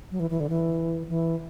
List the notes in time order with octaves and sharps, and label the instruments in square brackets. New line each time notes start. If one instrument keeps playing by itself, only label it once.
[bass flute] F#3
E3
E3
D3
E3
E3